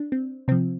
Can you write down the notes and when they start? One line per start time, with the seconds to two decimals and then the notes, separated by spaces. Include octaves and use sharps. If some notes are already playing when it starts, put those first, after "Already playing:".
Already playing: D4
0.12 C4
0.48 C3 F3 C4